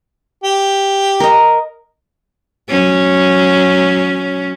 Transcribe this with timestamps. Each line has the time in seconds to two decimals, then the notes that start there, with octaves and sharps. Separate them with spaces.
0.44 G4
1.20 A#4 D#5
2.70 F#3 C#4